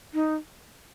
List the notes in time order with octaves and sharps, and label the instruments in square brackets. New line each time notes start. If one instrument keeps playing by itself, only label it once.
[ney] D#4